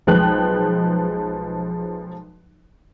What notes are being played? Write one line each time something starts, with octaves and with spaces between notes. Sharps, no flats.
B1 F3 G#3 B4 G5 F#6